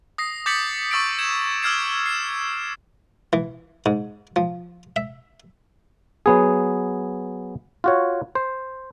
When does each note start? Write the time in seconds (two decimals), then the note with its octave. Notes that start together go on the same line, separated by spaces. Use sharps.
0.18 D#6 A#6 C7
0.46 D6 G6 A6 B6 C#7 F#7
0.91 C#6 D6 E6 A6 B6 D7
1.19 G#6 E7
1.63 D6 E6 F6 G#6 C7 E7
2.06 C7 E7
3.33 E3
3.86 G#2
4.36 F3
4.96 E5
6.26 F#3 B3 G#4
7.84 F4 F#4 C#5
8.35 C5